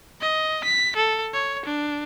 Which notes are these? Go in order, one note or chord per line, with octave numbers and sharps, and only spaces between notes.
D#5
B6
A4
C#5
D4